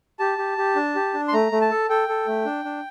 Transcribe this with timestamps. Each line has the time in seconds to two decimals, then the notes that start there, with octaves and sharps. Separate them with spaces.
0.19 G4 A5
0.38 G4
0.58 G4
0.76 D4
0.95 G4
1.14 D4
1.28 C6
1.33 A3 A#5
1.52 A3
1.61 A5
1.71 A4
1.89 A4 G5
2.08 A4
2.27 A3
2.45 D4
2.64 D4